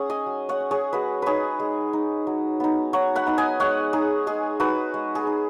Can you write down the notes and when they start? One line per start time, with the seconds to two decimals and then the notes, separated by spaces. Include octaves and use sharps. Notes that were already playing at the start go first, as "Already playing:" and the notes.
Already playing: C#4 G#4 C#5 F#5
0.10 D#5 G#5
0.26 F#3
0.49 C#5 F#5
0.60 C#4
0.71 G#4 C#5
0.93 G#3 F#4 B4
1.22 D#4 G#4 B4 C#5
1.60 G#3
1.93 D#4
2.27 F#3
2.60 B3 D#4
2.93 F#3 C#5 F#5
3.15 F#5 B5
3.26 B3 D#4
3.38 D#5 G#5
3.60 G#3 C#5 F#5
3.93 D#4 G#4
4.27 G#3 G#4
4.60 D#4 F#4 B4
4.94 G#3
5.15 G#4
5.27 D#4